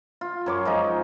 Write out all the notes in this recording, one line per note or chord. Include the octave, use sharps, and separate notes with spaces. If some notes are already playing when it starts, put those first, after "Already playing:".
F4
F#2 C#5 D6
F3 G#3 D#4